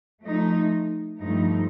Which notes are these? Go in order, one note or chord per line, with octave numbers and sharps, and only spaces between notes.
F3 A3 D#4
G2 F3 A3 D#4